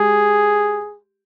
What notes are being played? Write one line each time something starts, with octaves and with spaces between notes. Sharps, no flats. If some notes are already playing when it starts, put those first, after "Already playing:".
Already playing: G#3 G4 G#4